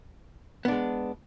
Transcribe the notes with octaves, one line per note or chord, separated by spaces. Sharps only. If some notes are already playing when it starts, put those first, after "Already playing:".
G#3 B3 D4